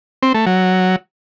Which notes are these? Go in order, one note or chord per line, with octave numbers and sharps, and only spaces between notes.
C4
A3
F#3